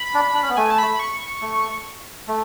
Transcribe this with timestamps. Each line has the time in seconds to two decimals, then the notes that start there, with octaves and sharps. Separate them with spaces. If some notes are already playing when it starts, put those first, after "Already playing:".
Already playing: B5
0.14 D4
0.34 D4
0.42 C#4
0.49 B3
0.56 A3 G#5
0.70 A5
0.78 B5
0.99 C#6
1.42 A3
2.28 A3